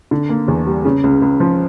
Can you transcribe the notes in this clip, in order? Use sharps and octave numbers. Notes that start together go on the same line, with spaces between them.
D3
A#3
E2
G3
C#3
C#2
C#2
F3